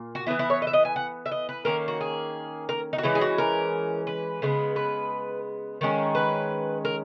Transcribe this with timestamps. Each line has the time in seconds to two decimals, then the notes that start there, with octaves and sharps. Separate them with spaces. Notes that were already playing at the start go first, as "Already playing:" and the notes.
Already playing: A#2 A#3
0.15 F#4
0.27 E3 B3 E4
0.39 E4
0.50 C#5
0.62 D#5
0.67 E5
0.73 D#5
0.85 G#5
0.96 F#5
1.26 E5
1.31 D#5
1.49 B4
1.65 D#3 A#3 C#4 A#4
1.88 F#4
2.01 G#4
2.69 A#4
2.93 D#4
2.98 F#4
3.03 E3 G#3 C#4 E4
3.15 G#4
3.21 F#4
3.38 A#4
4.07 B4
4.42 C#3 G#3 B3
4.76 B4
5.81 D#3 G#3 C#4
6.15 B4
6.85 A#4